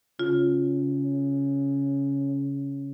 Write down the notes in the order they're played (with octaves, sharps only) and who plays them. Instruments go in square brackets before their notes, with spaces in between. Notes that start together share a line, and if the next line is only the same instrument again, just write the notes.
[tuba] C#3 [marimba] F4